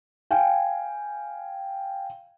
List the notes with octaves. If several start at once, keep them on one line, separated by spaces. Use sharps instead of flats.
F5 G5 G#5